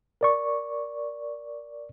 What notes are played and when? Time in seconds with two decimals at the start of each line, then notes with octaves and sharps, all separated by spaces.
0.21 A#4 D5 C#6